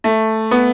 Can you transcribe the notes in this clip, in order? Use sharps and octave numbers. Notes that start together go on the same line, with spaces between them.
A3
B3